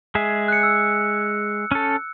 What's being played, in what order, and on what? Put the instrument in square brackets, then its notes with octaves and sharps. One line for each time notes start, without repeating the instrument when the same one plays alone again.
[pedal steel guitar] G#3 G#4 E5
[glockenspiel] F#6 C#7
E6
[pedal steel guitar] C#4 A4